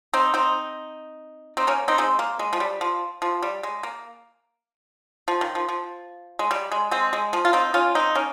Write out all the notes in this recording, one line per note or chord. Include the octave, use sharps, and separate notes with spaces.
C4 D#4
C4 D#4
C4 D#4
A#3 C#4
C4 D#4
G#3 C4
A#3
G#3
F3
G3
F3
F3
G3
G#3
A#3
F3
D#3
F3
F3
G#3
G3
G#3
G#3 C4
G#3
F3
F4
C4 D#4
C#4 F4
C4 D#4
A#3 C#4